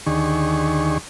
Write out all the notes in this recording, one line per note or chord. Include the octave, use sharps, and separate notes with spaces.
D#2 D3 D#3 G#4 C#6